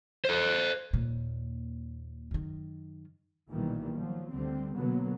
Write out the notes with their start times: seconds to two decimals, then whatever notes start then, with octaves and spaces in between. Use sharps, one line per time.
0.25 A4 C5
0.93 D#2 A#2
2.31 F#2 D#3
3.51 B1 A#2 D#3 E3 G3
3.97 F3 F#3
4.33 D2 D3 G3 C4
4.76 B2 D3 F#3 A#3 B3